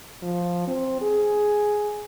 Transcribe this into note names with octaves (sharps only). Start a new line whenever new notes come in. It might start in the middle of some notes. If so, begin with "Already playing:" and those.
F3
C4
G#4